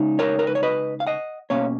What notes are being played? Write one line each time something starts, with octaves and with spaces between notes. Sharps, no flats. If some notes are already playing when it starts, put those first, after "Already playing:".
Already playing: C#3 G#3 D#4
A#4 C#5
A#4
B4
C#5
B4 D#5
F5
D#5 F#5
B2 A#3 C#4 C#5 F5